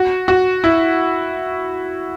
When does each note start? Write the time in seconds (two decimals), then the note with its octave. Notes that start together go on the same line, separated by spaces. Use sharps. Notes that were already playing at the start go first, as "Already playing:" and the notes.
Already playing: F#4
0.28 F#4
0.64 E4